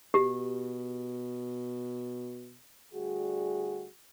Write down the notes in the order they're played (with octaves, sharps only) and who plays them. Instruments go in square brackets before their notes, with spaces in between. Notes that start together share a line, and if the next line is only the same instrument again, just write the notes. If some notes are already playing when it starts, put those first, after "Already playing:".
[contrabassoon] B2 [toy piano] G4
[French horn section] D2 G3 F#4 G#4